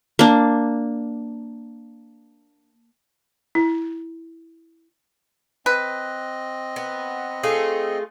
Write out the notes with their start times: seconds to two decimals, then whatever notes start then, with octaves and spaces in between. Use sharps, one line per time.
0.19 A#3 D4
3.55 E4
5.66 C4 B4 D#5
6.76 B3
7.43 A3 F4 G#4